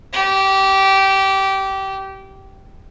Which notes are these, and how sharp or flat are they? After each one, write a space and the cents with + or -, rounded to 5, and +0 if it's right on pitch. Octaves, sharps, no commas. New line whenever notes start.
G4 -20